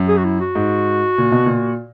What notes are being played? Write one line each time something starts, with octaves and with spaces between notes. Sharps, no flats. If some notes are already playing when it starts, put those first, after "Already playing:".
Already playing: F#2
G#4
F#4
E4
F#4
G#2
A#2
B2
A#2